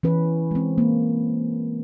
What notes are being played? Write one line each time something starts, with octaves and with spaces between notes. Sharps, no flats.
E3 C#4 B4
G#3 C4
A#3